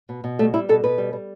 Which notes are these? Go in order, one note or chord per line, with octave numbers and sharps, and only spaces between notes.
B2
B2
G3 A3
G3 E4
B2 A4
B2 B4
G3
G3